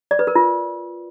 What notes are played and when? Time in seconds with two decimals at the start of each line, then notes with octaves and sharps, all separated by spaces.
0.11 D5
0.19 B4
0.27 A#4
0.35 F4